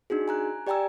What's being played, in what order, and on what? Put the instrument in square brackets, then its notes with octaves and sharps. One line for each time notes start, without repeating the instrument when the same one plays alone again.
[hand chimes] D4 D#4 F#4 G#4
G#5 A#5 F#6
G4 D5 G5 G#5 A#5 E6